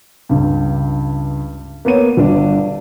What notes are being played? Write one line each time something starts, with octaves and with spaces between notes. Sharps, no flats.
C#2 G2
A#3 B3 C#5 D#7
G1 D4